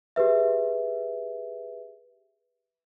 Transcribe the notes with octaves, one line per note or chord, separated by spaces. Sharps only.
G4 G#4 B4 E5